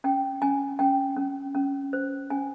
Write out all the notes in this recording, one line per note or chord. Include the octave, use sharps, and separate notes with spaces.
C#4 G5
C#4 G#5
C#4 G5
C#4
C#4
C5
C#4 G#5